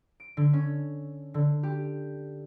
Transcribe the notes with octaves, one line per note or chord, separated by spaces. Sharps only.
D7
D3
C#4
D3
G4